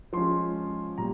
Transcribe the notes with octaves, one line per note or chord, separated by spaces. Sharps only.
F3 G#3 C#4 C6
A#2 G3 A#5